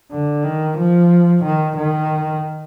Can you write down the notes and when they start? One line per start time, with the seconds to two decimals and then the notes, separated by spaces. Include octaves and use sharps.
0.11 D3
0.44 D#3
0.78 F3
1.44 D#3
1.77 D#3